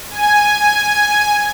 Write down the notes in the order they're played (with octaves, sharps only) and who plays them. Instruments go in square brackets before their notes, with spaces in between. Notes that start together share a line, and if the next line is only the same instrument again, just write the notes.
[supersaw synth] G#5